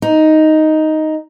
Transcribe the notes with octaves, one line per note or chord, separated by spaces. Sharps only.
D#4